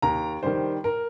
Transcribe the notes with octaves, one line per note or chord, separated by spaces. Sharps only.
D#2 A#5
D#3 G3 C5
A#4